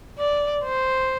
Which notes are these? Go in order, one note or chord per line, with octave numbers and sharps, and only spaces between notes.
D5
C5